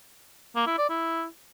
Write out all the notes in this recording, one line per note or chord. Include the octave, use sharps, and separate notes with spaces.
A#3
E4
D5
E4